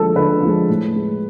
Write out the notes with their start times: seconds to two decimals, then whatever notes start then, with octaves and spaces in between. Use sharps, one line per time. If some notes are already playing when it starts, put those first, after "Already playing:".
Already playing: D3 F3 G#3 A4
0.15 D3 B4
0.43 F3 G#3
0.69 A2
0.96 G#3